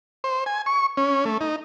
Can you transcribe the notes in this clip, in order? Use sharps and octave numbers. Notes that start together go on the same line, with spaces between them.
C5
G#5
C#6
C#4
A3
D#4